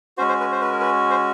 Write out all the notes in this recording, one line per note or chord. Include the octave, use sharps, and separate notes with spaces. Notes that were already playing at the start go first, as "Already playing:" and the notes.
G#3 C#4 F#4 C5
C5
B4
C5
B4
A#4
B4
C5